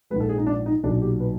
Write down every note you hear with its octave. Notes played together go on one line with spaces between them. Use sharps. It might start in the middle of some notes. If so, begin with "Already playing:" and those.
A#1 G#2 F3 G#3 B4
A4
G#4
D#4
D4
D#4
B1 A#2 F#3 D4
G4
B4